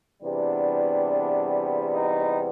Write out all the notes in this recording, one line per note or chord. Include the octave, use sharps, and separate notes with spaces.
E2 C3 E3 G3 B3 D4
D#4